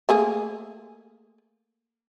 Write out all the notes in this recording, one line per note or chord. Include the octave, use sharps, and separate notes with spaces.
A3 A#3 G#4